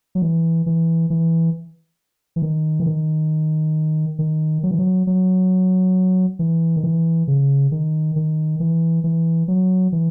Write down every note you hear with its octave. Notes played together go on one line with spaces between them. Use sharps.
F#3
E3
E3
E3
E3
D#3
E3
D#3
D#3
F#3
E3
F#3
F#3
E3
D#3
E3
C#3
D#3
D#3
E3
E3
F#3
E3